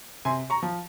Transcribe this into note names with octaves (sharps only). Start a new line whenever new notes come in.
C3 G#5 C6
A#5 C#6
F3